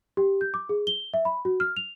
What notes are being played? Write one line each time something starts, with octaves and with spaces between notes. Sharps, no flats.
G4
G6
D6
G#4
G7
E5
B5
F#4
F6
F7